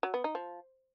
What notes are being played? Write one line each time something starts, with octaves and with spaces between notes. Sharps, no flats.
F#3
B3
D#4
F3